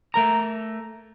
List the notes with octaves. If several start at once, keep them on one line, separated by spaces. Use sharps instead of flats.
A3 A#4 A#5